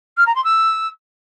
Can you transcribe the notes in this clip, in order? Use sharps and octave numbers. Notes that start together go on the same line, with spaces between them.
F6
A#5
C6
E6